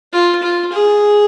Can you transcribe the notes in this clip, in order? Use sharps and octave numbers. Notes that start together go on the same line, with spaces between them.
F4
F4
G#4